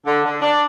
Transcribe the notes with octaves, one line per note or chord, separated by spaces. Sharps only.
D3
D3
D4